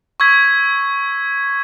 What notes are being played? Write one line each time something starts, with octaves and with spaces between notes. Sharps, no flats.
C#6 E6 G#6 B6